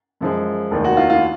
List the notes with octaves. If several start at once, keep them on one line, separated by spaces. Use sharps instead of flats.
F#2 F3 G#3
F1 D#2 D#3
F#4
F4
F4